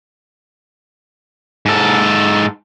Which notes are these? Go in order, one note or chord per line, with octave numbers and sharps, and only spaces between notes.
G#2 A4